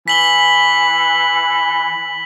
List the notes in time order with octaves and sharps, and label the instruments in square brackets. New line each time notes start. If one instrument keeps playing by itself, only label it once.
[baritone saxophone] E3 [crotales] B6 F#7 G7